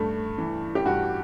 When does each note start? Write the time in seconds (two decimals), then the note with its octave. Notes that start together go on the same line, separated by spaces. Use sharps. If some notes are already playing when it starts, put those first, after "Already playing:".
Already playing: G2 A3
0.38 E3
0.75 G4
0.85 G2 F#4